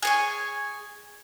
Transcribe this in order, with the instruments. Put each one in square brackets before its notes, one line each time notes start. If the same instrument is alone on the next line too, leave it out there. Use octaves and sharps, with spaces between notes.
[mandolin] G#4 C#5 G#5